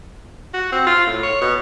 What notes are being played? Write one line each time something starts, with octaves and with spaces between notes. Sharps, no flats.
F#4
C4
F4
A2
C#5
B2